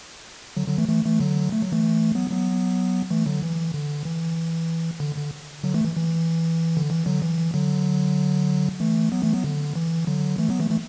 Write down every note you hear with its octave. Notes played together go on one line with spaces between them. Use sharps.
D3 F#3
D3 F#3
E3 A3
E3 A3
E3 A3
D3 F#3
A3
F#3
E3 A3
F#3 B3
F#3 B3
E3 A3
D3 F#3
E3
D3
E3
D3
D3
D3 F#3
E3 A3
E3
E3
D3
E3
D3 F#3
E3
D3 F#3
E3 A3
F#3 B3
E3 A3
F#3 B3
D3
E3
D3 F#3
E3 A3
F#3 B3
E3 A3
E3 A3